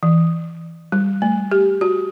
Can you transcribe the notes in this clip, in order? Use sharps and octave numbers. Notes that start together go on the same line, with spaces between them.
E3
G3
A3
G4
F#4